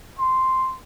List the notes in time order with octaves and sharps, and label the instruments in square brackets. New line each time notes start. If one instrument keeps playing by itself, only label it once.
[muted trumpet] C6